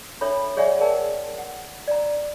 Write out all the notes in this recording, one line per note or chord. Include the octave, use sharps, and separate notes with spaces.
D4 A4 C#5 E5 B5
G#4 C#5 D5 E5 F#5 G#5
G#4 A#4 D5 F#5 G5 A5
F#5
D5 A#5